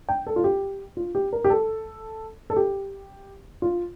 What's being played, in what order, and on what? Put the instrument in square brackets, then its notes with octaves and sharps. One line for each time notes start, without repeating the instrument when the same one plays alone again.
[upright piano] G5
A4
F4
G4
F4
G4
A#4
G4
A4
A4
G4
F4